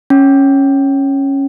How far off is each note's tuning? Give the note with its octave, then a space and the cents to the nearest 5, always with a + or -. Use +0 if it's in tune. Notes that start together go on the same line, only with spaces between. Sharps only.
C#4 -10